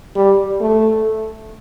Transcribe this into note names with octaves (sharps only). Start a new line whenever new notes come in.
G3
A3